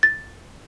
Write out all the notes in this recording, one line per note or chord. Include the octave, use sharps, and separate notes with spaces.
A6